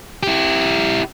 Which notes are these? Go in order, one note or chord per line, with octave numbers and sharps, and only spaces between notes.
E4 G4